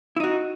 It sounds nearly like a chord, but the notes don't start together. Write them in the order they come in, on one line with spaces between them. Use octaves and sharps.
E4 D#4 F#4